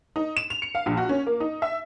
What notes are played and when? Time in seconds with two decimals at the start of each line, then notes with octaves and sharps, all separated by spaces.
0.16 D#4
0.37 E7
0.50 F7
0.62 C#7
0.75 F5
0.86 A#1
0.97 F#4
1.09 C#4
1.27 A#3
1.40 D#4
1.62 E5